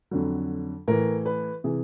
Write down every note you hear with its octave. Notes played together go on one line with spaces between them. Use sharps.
F2 D3 F#3
A2 E3 A#4
B4
C3 E3 G#4